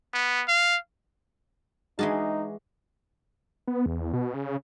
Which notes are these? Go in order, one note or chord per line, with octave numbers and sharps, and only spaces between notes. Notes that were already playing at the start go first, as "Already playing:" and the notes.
B3
F5
E3 G#3 D4 D#4 F#4 G#4 A5
B3
E2
B2
C#3